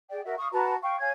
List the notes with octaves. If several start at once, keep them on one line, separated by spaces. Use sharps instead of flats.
G#4 D5 G5
F#4 A#4 E5
F5 C#6 D#6
F#4 B4 A5 A#5
F5 G5 C#6
C#5 F5 G#5 G#6